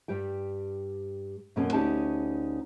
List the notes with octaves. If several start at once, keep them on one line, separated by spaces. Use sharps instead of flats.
G2 G3 G4 G5
F#2 B2 A#3 B3 C#4 A4
D2 C#4 D#4 G4 D5 A5